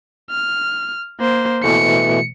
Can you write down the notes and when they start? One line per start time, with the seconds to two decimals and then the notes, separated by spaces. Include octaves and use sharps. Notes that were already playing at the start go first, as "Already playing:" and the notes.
0.31 F6
1.20 A#3 C5
1.64 B2 E3 A3 C#7